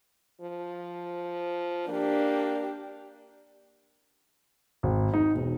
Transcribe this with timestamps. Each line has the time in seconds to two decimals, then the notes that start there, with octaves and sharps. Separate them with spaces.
0.41 F3
1.88 A#3 D4 G4
4.83 G#1
5.14 D#4
5.35 E1